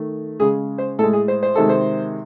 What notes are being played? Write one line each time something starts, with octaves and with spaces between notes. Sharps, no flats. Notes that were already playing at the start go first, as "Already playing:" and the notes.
Already playing: D#3 A3
C#3 G#3 G#4
C5
A2 G#3 A4
G#4
C5
C5
C3 D#3 G#3 A4
C5